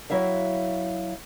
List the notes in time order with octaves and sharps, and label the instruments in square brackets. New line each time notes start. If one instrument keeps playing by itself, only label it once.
[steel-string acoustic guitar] F#3 E4 E5 F5